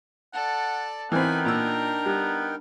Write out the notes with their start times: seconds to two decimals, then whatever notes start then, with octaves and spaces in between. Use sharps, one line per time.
0.34 A4 D5 F#5
1.12 E3 B3 C4 D#4 A#4 G5 G#5 B5
1.45 A#2 D4 A#5 E6
2.06 G3 B3